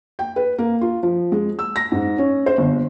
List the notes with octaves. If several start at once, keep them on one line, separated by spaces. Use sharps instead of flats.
G5
B4
A#3
F4
F3
G#3
E6
A#6
G#2
C#4
C5
G1